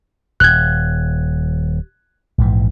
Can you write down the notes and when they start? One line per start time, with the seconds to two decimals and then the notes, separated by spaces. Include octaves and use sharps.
0.40 D#1 F#6 G#6
2.38 A#1 G#2 E3